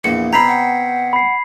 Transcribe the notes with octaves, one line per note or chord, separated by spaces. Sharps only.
A#1 E2 A#3 C#7
B2 C4 G5 A#5 B5 G#6 B6 C7
F#5
B5 C7